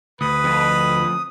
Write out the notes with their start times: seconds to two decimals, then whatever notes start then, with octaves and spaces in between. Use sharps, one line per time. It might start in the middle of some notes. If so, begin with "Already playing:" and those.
0.21 D2 B4 D#6
0.44 F2